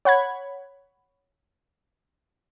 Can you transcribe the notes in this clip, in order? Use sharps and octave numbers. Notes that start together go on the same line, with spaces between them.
C#5 F#5 B5 G#6